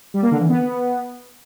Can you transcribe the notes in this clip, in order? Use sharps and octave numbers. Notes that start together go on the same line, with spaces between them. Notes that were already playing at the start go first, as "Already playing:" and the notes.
G3
A#3
D3
E3
B3